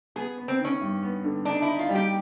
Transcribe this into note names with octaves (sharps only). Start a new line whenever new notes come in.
B3 G#4
B3
C4
D#3
C#4
G2
B3
D3
D4 D#4
E4
D#4
F4
G3
G4